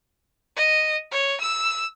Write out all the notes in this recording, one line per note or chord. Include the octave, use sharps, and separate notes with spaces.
D#5
C#5
E6